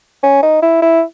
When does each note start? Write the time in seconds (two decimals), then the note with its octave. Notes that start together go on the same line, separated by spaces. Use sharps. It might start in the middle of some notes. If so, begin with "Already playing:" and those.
0.23 C#4
0.43 D#4
0.62 E4
0.82 E4